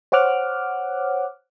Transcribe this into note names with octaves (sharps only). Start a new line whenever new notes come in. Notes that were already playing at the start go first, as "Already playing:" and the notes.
C5 C#5 F#5 D6 F6 F#6